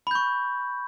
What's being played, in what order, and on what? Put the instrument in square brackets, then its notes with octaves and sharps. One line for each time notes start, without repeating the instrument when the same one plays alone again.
[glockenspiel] B5
G6
C#6